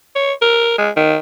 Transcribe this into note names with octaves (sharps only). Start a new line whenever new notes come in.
C#5
A#4
G#3
D#3